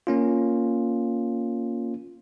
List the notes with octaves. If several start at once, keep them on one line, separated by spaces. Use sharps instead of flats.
A#3 C#4 F4